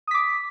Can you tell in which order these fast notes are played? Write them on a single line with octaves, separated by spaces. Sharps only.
D#6 B6 D6